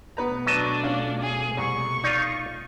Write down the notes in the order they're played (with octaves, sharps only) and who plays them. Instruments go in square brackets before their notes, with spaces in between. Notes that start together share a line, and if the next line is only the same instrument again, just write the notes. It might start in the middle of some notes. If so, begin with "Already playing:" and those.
[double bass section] B2 A3 [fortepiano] B3 B4 A#5
[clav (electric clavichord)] F#3 D#5 A5 [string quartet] D4
[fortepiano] C#4 F4
[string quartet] G#4
[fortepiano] C2 [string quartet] C#6
[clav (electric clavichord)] D#4 F4 [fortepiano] D5